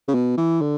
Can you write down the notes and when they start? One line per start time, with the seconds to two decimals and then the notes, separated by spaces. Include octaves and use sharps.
0.08 C#3
0.14 B2
0.37 E3
0.61 D3